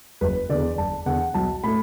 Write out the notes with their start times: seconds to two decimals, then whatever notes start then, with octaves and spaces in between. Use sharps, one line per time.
0.21 F#1 B4
0.49 E2 D3 D5
0.78 F#1 A5
1.06 E2 D3 F#5
1.34 B1 A5
1.64 A2 A3 B5